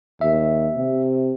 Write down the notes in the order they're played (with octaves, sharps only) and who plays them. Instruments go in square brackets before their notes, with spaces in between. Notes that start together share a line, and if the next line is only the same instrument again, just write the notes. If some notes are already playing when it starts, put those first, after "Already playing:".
[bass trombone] D#2 [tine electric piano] E5
[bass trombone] C3